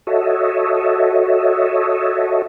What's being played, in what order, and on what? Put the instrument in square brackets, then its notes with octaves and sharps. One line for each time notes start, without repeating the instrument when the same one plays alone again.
[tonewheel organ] F#4 A4 C#5 D#5 E5